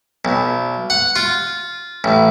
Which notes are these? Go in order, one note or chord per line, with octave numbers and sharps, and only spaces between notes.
B1
F#5
F4
A1